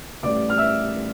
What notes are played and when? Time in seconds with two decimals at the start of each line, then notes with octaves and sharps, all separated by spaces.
0.23 A1 A2 G3 D5 D6
0.50 F6
0.58 E5 E6